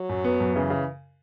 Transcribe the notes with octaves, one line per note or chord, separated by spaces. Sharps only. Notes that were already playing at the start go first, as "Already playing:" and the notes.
Already playing: F#3
F#2
B3
F#2
C#3 E3
C#3